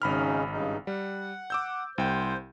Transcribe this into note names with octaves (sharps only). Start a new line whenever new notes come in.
G#1 C#3 C#4 D#4 B5 F6
G2 C#3 D#4
G3 F#5
D6 E6 G6
C2 C5 G5